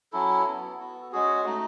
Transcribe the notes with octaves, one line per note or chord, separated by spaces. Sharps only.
F#3 C#4 E4 A4
B3 E4
B3 F#4
G#3 C#4 F#4 G#4
A3 D#4 F#4